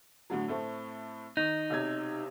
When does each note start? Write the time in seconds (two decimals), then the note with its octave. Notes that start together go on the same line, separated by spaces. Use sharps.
0.30 A2 D3 F#3
0.48 A2 A3 C4
1.37 D#3 D#4
1.70 B1 C3 G#6